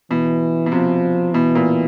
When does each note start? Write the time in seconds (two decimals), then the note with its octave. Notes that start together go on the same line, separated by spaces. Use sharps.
0.11 B2 E3
0.66 B2
0.72 C3 F3
1.34 B2 E3
1.55 A#2